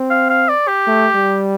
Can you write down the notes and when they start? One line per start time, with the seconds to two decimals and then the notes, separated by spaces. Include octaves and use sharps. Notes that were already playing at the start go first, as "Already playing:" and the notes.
Already playing: C4
0.10 F5
0.30 F5
0.49 D5
0.68 G4
0.87 A3
1.15 G3